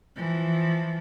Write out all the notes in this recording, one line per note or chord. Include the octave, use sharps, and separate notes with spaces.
E3 F3